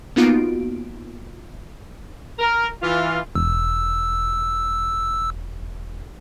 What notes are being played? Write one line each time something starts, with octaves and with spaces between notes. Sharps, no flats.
A#3 B3 D#4 F4 F#4 D7
A#4
E3 F4
E1 E6